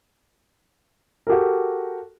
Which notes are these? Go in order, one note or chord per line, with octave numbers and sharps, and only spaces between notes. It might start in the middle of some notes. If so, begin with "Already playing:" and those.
F#4 G4 A4 A#4